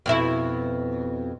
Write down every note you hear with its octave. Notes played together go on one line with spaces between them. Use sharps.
F2 B2 E4